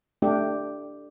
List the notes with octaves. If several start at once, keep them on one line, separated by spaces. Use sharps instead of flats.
A3 D4 G4